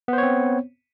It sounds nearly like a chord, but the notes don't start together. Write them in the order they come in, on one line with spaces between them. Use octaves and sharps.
B3 C5 C#5 C4